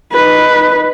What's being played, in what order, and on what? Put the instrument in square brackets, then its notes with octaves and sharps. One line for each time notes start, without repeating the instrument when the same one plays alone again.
[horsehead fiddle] D#4 B4